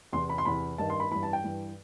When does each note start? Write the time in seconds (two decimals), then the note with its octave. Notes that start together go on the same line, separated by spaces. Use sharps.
0.13 E2 C3 E3 C6
0.29 B5
0.38 C6
0.45 E2 C3 E3 B5
0.78 G2 D#3 A5
0.90 C6
1.00 B5
1.11 G2 E3 B5
1.23 A5
1.33 G5
1.44 G2 E3